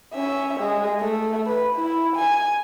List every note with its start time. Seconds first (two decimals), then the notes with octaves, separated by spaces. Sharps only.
0.14 C#4 E5
0.60 G#3
1.00 A3
1.47 B4
1.75 E4
2.16 G#5